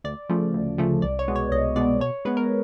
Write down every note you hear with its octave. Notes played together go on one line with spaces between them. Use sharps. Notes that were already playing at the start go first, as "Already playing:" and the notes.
D2 D5
C#3 F3 A3
D2
C#3 F3 A3
C2 D5
C#5
B2 G#3 B3
C#5
C2 D#5
B2 G#3 B3 D5
B2 C#5
G#3 B3 B4
A#4